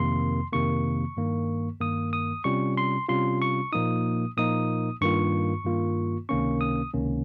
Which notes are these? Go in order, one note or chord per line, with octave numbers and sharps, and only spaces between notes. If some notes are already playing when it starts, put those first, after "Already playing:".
Already playing: F2 C3 D#3 A#3 C6
F2 C3 D#3 A#3 C#6
G2 D#3 A#3
G2 D#3 A#3 D#6
D#6
C3 G3 C#4 F4 C#6
C6
C3 G3 C#4 F4 C6
C#6
A#2 F3 A#3 D#4 D#6
A#2 F3 A#3 D#4 D#6
G2 D#3 A#3 F4 C#6
G2 D#3 A#3 F4
C#2 C3 D#3 A#3 C#4 C#6
D#6
C#2 C3 D#3 A#3 C#4